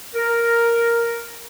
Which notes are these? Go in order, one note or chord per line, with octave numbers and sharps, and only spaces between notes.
A#4